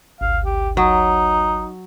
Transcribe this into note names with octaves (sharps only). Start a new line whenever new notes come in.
G#1 D2 F5
G4
F#3 D#4